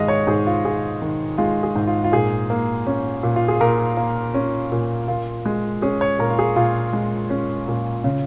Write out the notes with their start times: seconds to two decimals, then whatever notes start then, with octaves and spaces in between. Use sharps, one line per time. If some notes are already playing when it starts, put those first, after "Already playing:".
Already playing: G#2 D#3 G#3 D#5 F5
0.08 C#5
0.27 G#2 G#4
0.46 F4
0.65 G#2 G#4
1.02 D#3
1.38 G#3 F4
1.63 G#4
1.75 G#2
1.87 F4
2.04 F4
2.12 A#2 G#4
2.50 A#3
2.87 C#4
3.23 A#2
3.36 F4
3.48 G#4
3.61 A#2 A#4
3.97 A#3
4.34 C#4
4.72 A#2
5.08 A#2 F4
5.45 G#3
5.82 C#4 G#4
6.01 C#5
6.19 A#2 A#4
6.30 F4
6.39 G#4
6.56 A#2 F4
6.93 G#3
7.30 C#4
7.68 A#2
8.04 C#3